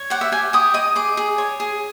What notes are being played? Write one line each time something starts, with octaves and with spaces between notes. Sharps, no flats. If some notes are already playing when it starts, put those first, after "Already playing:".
Already playing: C#5
G4 F#5
E5
G4 G#5
G4 D#6
D#5 D#6
G#4 D6
G#4
C#5
G#4